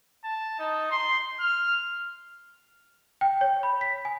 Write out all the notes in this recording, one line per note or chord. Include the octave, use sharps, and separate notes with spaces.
A5
D#4
C6
F6
G5
C#5
B5
B6
G#5